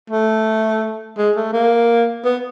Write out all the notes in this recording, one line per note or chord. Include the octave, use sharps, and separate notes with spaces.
A3
G#3
A3
A#3
B3